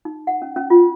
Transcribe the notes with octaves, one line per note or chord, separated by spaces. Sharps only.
D#4
F#5
C#4
C#4
F4